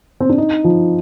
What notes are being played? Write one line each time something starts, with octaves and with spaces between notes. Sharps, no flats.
C4
D4
D#4
F3